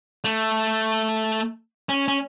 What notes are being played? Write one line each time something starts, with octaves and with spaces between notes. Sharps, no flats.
A3
C#4
C#4